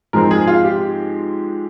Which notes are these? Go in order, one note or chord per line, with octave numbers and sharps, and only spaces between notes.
G#2 F3 G#3 C4 A#4
G#4
F4
G4